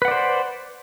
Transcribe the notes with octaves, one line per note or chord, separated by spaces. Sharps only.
B4 C5 D5 F#5